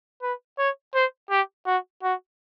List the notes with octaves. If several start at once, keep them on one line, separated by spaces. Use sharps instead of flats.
B4
C#5
C5
G4
F#4
F#4